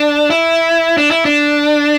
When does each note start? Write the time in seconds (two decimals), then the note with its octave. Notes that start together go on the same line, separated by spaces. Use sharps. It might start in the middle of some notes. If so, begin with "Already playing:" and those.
Already playing: D4
0.30 E4
0.98 D4
1.11 E4
1.25 D4